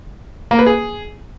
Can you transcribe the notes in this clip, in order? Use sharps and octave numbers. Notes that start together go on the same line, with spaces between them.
A#3
B4
G#4